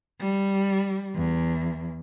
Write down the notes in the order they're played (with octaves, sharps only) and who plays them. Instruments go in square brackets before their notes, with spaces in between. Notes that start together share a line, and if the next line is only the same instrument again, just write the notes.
[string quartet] G3
E2